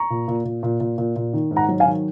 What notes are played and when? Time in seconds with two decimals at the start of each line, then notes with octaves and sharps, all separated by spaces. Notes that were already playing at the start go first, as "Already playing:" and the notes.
Already playing: A#5 C#6
0.10 A#2
0.28 A#2
0.45 A#2
0.63 A#2
0.80 A#2
0.98 A#2
1.16 A#2
1.33 D#3
1.51 G#2
1.56 F#5 A#5
1.68 F#3
1.80 F5 G#5
1.86 D#3